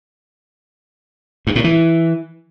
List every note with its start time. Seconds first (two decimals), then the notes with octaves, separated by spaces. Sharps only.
1.47 G2
1.55 A2
1.64 E3